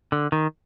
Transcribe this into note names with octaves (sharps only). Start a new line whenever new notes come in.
D3
D#3